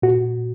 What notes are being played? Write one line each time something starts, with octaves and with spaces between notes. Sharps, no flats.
A#2 F#4